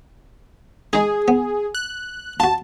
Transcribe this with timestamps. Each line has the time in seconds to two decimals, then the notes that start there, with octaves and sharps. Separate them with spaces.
0.93 G#3 D#4 G#4
1.28 B3
1.75 F#6
2.40 F4 F#4 A5